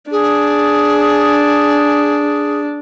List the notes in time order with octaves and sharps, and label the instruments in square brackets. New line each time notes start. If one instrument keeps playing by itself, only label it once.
[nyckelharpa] D4 [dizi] G#4